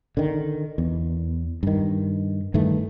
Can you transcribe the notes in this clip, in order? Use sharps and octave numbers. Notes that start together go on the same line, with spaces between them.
D3 D#3
E2
G2 D#3
G2 D#3 E3 A3